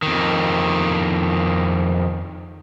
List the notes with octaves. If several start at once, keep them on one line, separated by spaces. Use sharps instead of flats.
F2 D#3